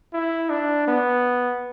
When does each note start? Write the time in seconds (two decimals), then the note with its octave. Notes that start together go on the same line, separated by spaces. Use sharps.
0.13 E4
0.50 D4
0.88 B3